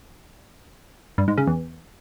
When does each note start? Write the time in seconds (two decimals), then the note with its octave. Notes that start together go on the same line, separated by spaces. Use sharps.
1.18 G2
1.28 G#2
1.38 C#3
1.47 E2